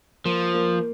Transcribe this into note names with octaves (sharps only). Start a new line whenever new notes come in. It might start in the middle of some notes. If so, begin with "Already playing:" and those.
F3 A#3
A#3